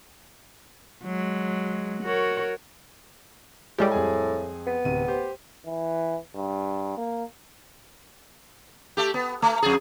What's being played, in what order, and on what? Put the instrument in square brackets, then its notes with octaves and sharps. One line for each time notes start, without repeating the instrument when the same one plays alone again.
[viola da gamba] F#3 G#3
F#4 A#4 C#5
[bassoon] A2 [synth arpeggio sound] G3 G#3 G4
[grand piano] F2 G#4 G#5
[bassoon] B3
[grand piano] D1 C3 D#7
G4 C5
[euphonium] E3
G2
A#3
[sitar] A3 G4
B3
A3
F2 G#4